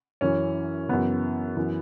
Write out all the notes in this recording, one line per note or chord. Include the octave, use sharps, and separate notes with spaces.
F#2 E3 C#4
F#2 C#3 E3 B3
F#2 E3